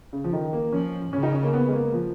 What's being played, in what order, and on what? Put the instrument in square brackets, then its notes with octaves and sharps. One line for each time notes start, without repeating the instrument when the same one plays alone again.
[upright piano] C#3
F3
D#3
A#3
[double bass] F3 [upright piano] C#4
[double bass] C#3 [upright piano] C#4
[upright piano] D#4
C#4
A#3
B3
G#3
A#3
F3